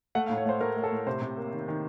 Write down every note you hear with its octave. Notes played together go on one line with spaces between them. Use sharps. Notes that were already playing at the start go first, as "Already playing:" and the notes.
A3 F#5
F5
A2
C#5
A3 C5
A3 A#4
A3
A4
A2
C3 C5
C3
A#3
D#3
D#3